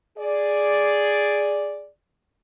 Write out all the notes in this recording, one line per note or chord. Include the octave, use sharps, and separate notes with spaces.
G#4 D5